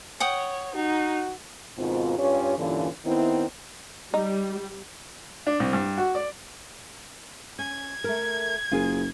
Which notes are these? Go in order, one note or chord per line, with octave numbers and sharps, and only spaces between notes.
C#5 F#5 G5 D#6
D#4 F#4
G#2 B2 D#3 C4 F4
G2 C#4 F4 G4 C#5
G2 A#2 D3 E3 C#4 F4
D#3 B3 C4 E4
G3 D#4
D4
C2
G2
F#4
D5
C#4 G#6
A3 A#4
F#1 F4 G#4 A#4